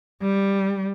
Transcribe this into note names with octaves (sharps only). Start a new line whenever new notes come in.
G3